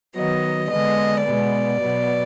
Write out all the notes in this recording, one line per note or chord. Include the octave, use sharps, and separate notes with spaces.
D#3 F#3 B3 D#5
D3 G#3 B3 D#5
B2 G#3 B3 D5
B2 F#3 B3